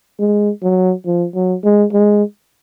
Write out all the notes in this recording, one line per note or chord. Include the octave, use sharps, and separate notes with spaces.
G#3
F#3
F3
F#3
G#3
G#3